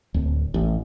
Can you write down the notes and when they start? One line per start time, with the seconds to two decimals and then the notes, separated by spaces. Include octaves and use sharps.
0.14 D1
0.54 A1